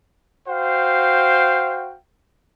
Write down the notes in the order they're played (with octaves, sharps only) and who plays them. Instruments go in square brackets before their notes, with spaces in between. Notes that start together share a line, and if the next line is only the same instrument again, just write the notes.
[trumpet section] F#4 C5 F5 G5